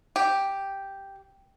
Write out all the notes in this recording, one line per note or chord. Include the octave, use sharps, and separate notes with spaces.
G4